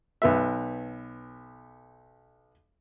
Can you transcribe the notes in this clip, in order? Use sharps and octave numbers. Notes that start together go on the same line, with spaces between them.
B1 B3 E5